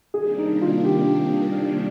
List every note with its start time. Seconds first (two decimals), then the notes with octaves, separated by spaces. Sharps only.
0.14 C3 D#3 G3 A#3 D4 G#4
0.38 D#4
0.61 F4
0.84 G4